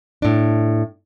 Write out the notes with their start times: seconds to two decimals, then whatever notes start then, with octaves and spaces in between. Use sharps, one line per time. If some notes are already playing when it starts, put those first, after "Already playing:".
0.22 A2 D4